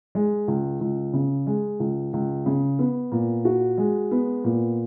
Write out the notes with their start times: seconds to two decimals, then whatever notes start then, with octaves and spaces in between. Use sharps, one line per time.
0.15 G#3
0.48 C#2
0.80 C#2
1.13 C#3
1.47 G#3
1.80 C#2
2.13 C#2
2.46 C#3
2.79 B3
3.12 A#2
3.45 F#4
3.78 G#3
4.11 B3
4.44 A#2